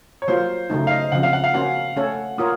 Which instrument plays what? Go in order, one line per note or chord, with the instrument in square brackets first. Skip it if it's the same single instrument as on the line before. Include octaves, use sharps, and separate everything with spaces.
[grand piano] C#5
[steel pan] F#3 A#3 F4 [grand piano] C5
[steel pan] C#3 F#3 A3 D#4
[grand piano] F5
D#5
[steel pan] C#3 F3 C4 [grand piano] F#5
[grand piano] F5
F#5
F5
[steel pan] A#3 C#4 F#4 C5 [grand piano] F#5
[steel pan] A3 C#4 A4 C#5
[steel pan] A#3 F4 A#4 C#5 [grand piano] D#6